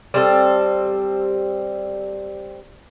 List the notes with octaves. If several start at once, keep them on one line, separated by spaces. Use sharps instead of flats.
G3 C4 A4